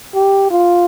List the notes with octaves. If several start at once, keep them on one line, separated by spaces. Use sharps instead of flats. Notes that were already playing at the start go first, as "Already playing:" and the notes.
G4
F4